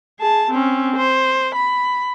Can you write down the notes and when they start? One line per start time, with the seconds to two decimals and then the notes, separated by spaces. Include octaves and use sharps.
0.20 G#4 A5
0.51 C4 C#4
0.97 C5
1.55 B5